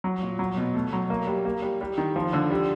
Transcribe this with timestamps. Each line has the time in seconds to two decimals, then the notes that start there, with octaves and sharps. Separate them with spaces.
0.04 F#3
0.22 A#2
0.39 F#3
0.57 B2
0.74 A3
0.93 F#3
1.10 A#3
1.27 G3
1.45 A#3
1.62 G3
1.81 G3
1.98 D#3
2.16 F3
2.33 D3
2.51 G3